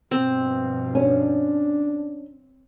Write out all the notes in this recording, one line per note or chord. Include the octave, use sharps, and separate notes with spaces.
G2 B2 F3 C4
C#4 D4